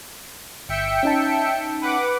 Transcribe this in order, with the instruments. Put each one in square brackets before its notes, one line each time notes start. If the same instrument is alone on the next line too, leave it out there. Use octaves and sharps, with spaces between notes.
[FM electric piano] G1 [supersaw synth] E5 G5 C#7
[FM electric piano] C#4 D#4 A5
[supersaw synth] B4 F#5 D6